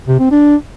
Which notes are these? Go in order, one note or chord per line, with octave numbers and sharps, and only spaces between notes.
C3
C4
D4